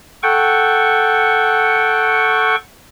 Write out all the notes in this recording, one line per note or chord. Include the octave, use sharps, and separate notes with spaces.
A4 F#5 G5 C#6